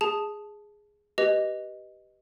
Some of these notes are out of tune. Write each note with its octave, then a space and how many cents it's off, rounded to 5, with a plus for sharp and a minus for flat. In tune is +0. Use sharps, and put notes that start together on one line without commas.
G#4 +0 A5 -10
G4 -15 B4 +0 D#5 +0